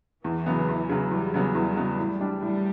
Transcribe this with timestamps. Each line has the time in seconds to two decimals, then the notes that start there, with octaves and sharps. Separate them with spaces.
0.24 E2 E3
0.46 C#3 F#3 B3
0.68 E2
0.89 C#3 F#3 B3
1.11 E2 G3
1.34 C#3 F#3 B3
1.55 E2 G3
1.76 C#3 F#3 B3
1.99 A2
2.21 G3 D4
2.42 A2 G3